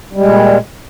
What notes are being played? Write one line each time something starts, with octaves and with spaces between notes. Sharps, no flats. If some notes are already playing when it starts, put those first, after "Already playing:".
A#2 G3 G#3